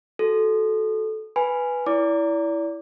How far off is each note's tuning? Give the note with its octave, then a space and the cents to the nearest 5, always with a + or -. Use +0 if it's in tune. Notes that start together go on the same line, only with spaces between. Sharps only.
F#4 +0 A4 -15
B4 +0 G#5 +0 B5 +0
E4 +0 D5 -35 D6 +0